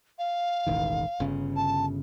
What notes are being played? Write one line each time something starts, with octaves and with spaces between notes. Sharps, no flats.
F5
E1 A1 D#3
G1 C#3
A5